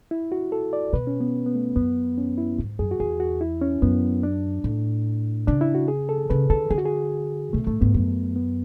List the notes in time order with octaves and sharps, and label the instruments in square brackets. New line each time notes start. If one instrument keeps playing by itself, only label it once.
[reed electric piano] E4
F#4
A4
D5
[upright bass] B2 [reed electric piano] B4
[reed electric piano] C#4
B3
B3
A3
[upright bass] F#2 [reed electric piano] B3
[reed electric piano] C#4
E4
[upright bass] G#2
[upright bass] F#2 [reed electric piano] G#4
[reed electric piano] F#4
[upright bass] E2 [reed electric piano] G#4
[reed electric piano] F#4
E4
C#4
[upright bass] F#2 [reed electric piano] B3
[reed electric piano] D4
[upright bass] A2
[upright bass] C#3 [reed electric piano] D4
[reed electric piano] E4
F#4
G#4
A4
[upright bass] C#3 [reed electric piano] B4
[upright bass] D3 [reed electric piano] A4
[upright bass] D3 [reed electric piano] G#4
[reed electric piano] F#4
G#4
[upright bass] B2 [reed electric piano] A3
[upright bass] A2 [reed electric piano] A3
[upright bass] G#2 [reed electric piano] B3
[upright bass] F#2
[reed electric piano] B3